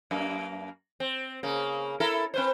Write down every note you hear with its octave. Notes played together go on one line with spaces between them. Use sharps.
F#2 A#3
C4
C#3 A#3
E4 A4 A#4
C4 B4 C5